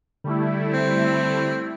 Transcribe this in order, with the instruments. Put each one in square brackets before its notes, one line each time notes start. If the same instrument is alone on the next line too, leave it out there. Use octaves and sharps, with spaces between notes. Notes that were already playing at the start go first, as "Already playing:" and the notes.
[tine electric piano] D3 [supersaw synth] G3 A3 E4
[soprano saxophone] C4